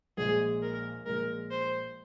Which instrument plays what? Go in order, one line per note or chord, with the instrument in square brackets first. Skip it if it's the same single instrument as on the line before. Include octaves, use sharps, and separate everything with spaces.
[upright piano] A#1 A#2 G#3 [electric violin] G#4
[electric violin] A#4
[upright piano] A#1 A#2 G#3 [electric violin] A#4
[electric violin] C5